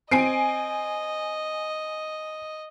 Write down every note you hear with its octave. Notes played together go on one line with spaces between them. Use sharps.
C4 D#5 G#5 C7 D7